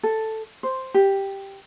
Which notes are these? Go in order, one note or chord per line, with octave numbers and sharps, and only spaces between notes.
A4
C5
G4